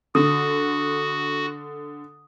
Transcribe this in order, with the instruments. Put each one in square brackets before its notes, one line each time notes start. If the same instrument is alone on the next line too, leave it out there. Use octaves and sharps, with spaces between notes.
[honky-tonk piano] D3 [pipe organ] F#4 [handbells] D#6